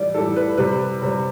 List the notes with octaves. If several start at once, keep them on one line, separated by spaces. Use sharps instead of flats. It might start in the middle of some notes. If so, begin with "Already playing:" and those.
Already playing: A2 E3 G3 D5
A2 E3 G3 A4
B4
C3 G3 B4
C3 G3